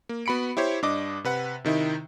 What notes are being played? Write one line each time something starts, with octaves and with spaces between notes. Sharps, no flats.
A#3
B3 F#4 B5 C#7 D7
E4 G4 C5 C#5
G2 D4 D#5 D6
C3 B4 F#5
C3 D#3 D#4 E4